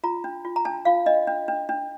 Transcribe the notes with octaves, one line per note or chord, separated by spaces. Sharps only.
F4 A#5
D4
F4
A#5
D4 A5
F4 F5
D4 D#5
D4
D4
D4